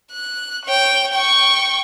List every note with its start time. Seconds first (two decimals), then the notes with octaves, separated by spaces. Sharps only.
0.12 F#6
0.65 C#5 G5
1.13 G5 C#6